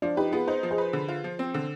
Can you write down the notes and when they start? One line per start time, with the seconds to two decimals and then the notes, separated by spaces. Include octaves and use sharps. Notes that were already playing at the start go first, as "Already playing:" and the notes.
0.02 F3 D4 F4
0.17 D#4 G4 B4
0.32 B3 F4 G#4
0.47 D#4 G#4 C5
0.63 F3
0.71 G#4 C5
0.78 B4
0.93 D3
1.08 F4
1.24 F3
1.39 C4
1.54 D3